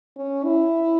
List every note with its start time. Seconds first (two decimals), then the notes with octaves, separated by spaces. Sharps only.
0.17 C#4
0.44 E4